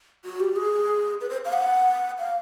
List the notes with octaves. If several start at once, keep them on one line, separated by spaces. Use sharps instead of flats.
F#4
G4
G#4
B4
C5
F5
F#5
F5